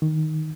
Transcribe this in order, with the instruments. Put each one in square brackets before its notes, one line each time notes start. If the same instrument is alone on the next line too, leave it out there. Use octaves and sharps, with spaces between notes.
[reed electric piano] D#3